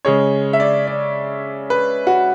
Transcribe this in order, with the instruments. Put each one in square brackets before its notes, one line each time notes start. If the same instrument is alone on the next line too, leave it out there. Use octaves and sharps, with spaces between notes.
[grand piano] C#3 G#3 C#5
E5
D5
D5
B4
F#4